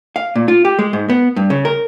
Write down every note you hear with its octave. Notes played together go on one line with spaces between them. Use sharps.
F5
A#2
F4
G4
G#3
G#2
B3
G2
C#3
A#4